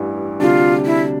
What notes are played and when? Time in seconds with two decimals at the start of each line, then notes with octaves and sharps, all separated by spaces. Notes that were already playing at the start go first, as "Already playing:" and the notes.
Already playing: A1 G2 E3
0.40 D2 C3 G3 D4 F4
0.85 E4